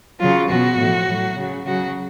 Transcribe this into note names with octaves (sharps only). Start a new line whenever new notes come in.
C#3 F#3 F4
B2 F#3 F#4
A2 F3
A2 F#3
C#3 F#3
C#3 F#3 F#4